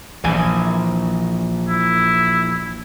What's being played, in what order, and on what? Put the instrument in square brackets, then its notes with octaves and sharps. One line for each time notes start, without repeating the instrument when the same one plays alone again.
[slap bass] A#1 [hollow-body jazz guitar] E3 D5 G#5
[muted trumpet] E4